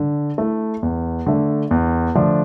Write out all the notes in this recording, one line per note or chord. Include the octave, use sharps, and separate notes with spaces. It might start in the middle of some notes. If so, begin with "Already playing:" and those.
Already playing: D3
A3 E4
E2
D3 A3
E2
D3 F3 A3 D4